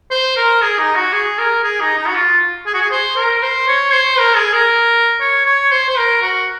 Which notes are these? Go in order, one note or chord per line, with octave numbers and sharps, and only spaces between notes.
C5
A#4
G#4
D#4
F#4
G#4
A#4
G#4
D#4
D#4
F#4
F4
G#4
F#4
G#4
C5
A#4
C5
C#5
C5
A#4
G#4
A#4
C#5
C#5
C5
C5
A#4
F#4